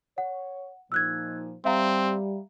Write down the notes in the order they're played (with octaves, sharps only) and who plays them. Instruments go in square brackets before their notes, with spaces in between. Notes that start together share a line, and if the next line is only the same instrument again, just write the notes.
[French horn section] C#5 [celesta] F#5
[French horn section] A#2 F3 D#4 [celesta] E6 F#6 G#6
[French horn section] G3 [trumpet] C4 [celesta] E5 F5 A#5